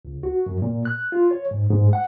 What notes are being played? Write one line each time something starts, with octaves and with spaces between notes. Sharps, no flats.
C#2
F#4
F#2
A#2
F#6
F4
C#5
G#2
G#2
F#5